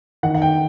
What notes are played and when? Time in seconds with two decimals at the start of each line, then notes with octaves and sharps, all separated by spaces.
0.23 D#3 F#5
0.35 F#5
0.42 G5